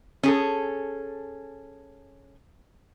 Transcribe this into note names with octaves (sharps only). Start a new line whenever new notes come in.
C#4 G#4 A4